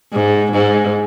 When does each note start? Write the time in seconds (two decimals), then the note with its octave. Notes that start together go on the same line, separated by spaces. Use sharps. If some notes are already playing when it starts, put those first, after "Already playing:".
0.12 G#2
0.52 G#2